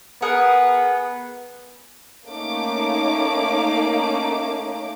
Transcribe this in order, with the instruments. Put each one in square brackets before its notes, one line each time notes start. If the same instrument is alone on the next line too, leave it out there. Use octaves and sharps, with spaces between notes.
[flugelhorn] B3 [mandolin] G#4 A#4 F#5
[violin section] A3 A#3 C#4 D#4 D6